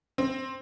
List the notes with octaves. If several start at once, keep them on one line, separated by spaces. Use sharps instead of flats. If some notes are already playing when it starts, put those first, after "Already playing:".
C4